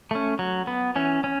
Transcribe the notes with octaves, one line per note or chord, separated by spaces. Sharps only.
A3 C#4
F#3
B3
E3 C#4
C#4